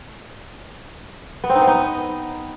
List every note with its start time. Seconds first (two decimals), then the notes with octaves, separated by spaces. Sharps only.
1.44 B3
1.50 C4
1.55 D#4
1.61 B3
1.67 D#4